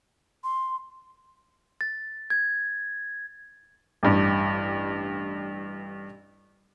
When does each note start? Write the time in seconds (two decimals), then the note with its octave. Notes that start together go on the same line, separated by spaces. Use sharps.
0.44 C6
1.81 A6
2.30 G#6
4.03 A1 G2